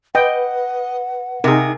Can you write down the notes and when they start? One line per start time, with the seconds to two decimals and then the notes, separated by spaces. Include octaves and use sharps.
0.15 B4 D#5 F#5 G5
1.44 C3 D#4 G#4 A#4